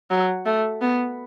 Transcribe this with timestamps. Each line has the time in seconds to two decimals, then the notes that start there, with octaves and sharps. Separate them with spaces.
0.11 F#3
0.46 A3
0.81 B3